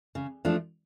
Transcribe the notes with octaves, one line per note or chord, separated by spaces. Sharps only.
C#3
F3 A3 D4